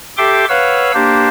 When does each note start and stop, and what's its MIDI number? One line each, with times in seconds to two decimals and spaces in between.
0.17 0.45 67
0.17 0.45 69
0.17 0.45 76
0.17 0.45 79
0.17 0.45 84
0.17 0.45 86
0.49 0.92 71
0.49 0.92 73
0.49 0.92 77
0.49 0.92 78
0.49 0.92 88
0.94 1.28 58
0.94 1.28 62
0.94 1.28 67
0.94 1.28 72